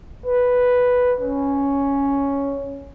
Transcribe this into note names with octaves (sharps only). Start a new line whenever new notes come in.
B4
C#4